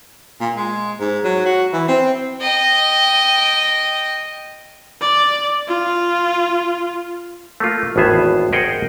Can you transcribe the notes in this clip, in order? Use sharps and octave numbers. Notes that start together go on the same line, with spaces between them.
A#2
G#3
G#2
F#3
F#4
E3
C4
D#5 G5
D5
F4
A3 A#3 F4
G#1 E2 A2 B3 G#4 E5
G#4 A#4 C5 D#5 F#5 G5